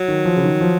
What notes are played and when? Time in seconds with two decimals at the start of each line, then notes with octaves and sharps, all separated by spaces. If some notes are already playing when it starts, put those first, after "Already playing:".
Already playing: F#3
0.08 D#3
0.25 F3
0.36 C#3
0.44 D#3
0.61 F3